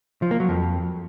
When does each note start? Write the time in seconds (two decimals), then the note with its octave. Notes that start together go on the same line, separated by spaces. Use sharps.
0.22 F3
0.31 A#3
0.40 F#3
0.49 F2